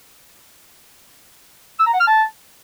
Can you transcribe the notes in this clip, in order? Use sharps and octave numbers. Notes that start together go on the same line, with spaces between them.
E6
A#5
F#5
F6
A5